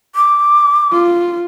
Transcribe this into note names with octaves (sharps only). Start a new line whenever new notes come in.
D6
F4